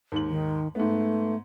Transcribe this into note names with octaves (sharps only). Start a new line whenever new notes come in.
D#2 G#2 F#7
D#3
G#2 A3 B3